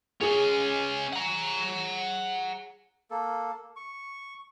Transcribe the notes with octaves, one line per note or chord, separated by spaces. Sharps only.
C#4 G#4 D#5
F#5 A#5
A#3 A4
C#6